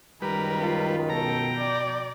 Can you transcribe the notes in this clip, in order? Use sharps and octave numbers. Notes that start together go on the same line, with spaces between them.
C#2 F#2 D#3 G3 A#4 B4
F4
B2 A4 G5 A#5
D5